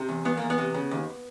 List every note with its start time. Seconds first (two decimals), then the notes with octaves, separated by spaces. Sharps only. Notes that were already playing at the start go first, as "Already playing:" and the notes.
Already playing: C3
0.09 E2
0.25 E2 B3
0.37 E2 A#3
0.50 B3
0.58 C3
0.75 C#3
0.91 D#2